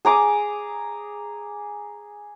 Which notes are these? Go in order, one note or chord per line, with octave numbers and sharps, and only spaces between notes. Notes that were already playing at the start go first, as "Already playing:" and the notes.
G#4 A#5 D6 D#6